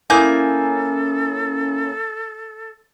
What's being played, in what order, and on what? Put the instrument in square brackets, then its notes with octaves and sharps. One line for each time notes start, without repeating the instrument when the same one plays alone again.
[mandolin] A#3 G#5 G6 [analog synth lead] C#4 [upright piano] E4 D#6 [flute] A4